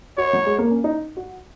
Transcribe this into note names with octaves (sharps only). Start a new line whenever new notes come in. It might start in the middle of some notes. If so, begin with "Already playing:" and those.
F#4 C#5
F#3
G#3
A#3
C#4
D#4
F#4